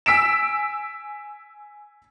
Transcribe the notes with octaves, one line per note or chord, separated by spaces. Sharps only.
G#5 E6 B6 D7 E7